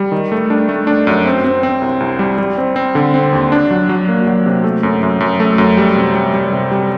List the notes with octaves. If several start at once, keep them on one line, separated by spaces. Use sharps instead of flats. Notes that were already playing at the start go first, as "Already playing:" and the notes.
Already playing: G3
D#3
A3
D4
A3
D4
F#2
C4
C4
C4
C2
C2
G3
G3
C4
C4
D3
C4
D#2
D4
F#3
F#3
A#3
F#3
C3
A3
F#2
F#2
F#2
A3
F#2
G3
C3
G3
G3
C3
G3